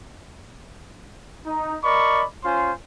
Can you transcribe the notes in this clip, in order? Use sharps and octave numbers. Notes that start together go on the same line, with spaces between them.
D#4
A#4 D5 D#5 B5 C#6
C#4 F4 C5 G#5 C6